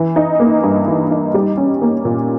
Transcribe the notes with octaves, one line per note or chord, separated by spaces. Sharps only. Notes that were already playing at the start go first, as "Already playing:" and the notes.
Already playing: E3
D#4
A#3
G2
E3
D#4
G3
C#4
A#3
A#2